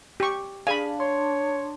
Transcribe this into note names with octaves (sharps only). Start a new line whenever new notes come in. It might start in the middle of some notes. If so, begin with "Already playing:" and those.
G4 C#6
D4 G#4 D5 F5 G#5 B5
C#5 C6